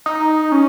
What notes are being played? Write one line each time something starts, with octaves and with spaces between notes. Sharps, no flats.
D#4
C#4